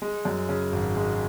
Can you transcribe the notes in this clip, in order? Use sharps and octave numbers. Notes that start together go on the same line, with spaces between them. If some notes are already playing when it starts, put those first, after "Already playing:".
G#3
F#2
C#3
G#1
G#3